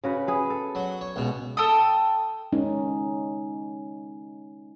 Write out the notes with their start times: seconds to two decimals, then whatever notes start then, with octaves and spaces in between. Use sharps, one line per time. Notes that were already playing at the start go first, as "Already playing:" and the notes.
0.04 C#3 F#4 B4
0.28 B3 G#4
0.50 A4
0.75 F#3
1.01 C#5
1.16 C#2 B2
1.57 A4 G5 A5 D#6
2.52 G#3 C#4 D#4